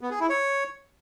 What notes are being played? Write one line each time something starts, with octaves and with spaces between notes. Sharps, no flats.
B3
G#4
E4
C#5